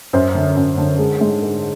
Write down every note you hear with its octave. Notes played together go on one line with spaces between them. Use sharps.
F#2 C5
D3
F#2
D3
G#3
G#2
G#3